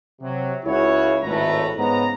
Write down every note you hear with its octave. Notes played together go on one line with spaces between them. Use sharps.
C3 F#3
C#2 C#3 E4 F#4 C#5
G#1 C#2 A2 A3 B4 A#5
G#2 C#3 B3 A#5